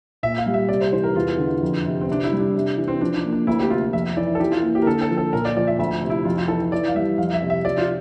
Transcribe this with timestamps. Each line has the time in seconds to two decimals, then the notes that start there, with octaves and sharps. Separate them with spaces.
0.23 A#2 E5
0.38 F5
0.46 G3
0.54 E5
0.69 C3 D5
0.81 C5
0.92 E3 C5
1.04 A#4
1.15 E2 F4
1.38 D3
1.63 F2
1.85 C3
2.01 C4
2.08 C3 D4
2.24 E4
2.32 G3
2.39 D4
2.55 C3
2.77 E3
2.88 C4
3.01 F3 D4
3.16 D4
3.25 A#3
3.33 D4
3.47 D2 E4
3.60 G4
3.70 C3 F4
3.93 F2 E5
4.17 E3 D5
4.35 A4
4.40 E3 G4
4.52 F4
4.63 A#3
4.75 G4
4.82 A#4
4.86 D3 A4
5.02 A4
5.10 F3
5.18 A4
5.33 A#2 A#4
5.45 D5
5.56 F3 D5
5.67 E5
5.79 D2 E5
6.02 C3
6.10 E4
6.25 F2 F4
6.37 F4
6.48 E3 A4
6.72 E3 D5
6.88 F5
6.95 G3 E5
7.18 F2 F5
7.34 E5
7.42 C3
7.50 E5
7.64 F3 D5
7.78 F4